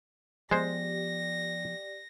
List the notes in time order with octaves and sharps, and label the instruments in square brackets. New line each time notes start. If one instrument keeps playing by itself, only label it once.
[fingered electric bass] F3 B3 [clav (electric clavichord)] G#3 C5 [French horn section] G4 D5 [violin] A#6